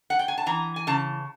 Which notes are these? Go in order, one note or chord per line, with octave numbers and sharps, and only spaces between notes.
F#5
G5
G#5
A5
E3 A#5
G#5
C#3 A5